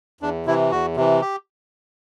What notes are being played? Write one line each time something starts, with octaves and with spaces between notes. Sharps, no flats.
E2 D4
C3 E3 E4
E2 F#4
C3 E3
G4